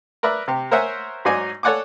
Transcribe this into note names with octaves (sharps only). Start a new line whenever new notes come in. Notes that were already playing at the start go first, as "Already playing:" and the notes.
A#4 B4 D5 E5
C3 G4
A#4 C5 C#5 E5 F#5 G#5
G#2 F#3 D#4 D5 G#5
A4 C#5 D5 F#5 G#5 D6